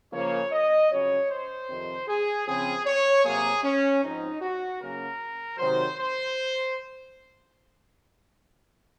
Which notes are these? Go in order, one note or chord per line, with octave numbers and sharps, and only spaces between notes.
C#3 F3 A#3 C#5
D#5
F2 C#3 F#3 C#4 C#5
C5
F2 C3 D#3
G#4
C#3 F3 C4 G#4
C#5
C3 F#3 A#3 G#4
C#4
G#2 F3 C4 D#4
F#4
C#3 F#3 A#3 C#4 A#4
C3 D#3 F#3 C5
C5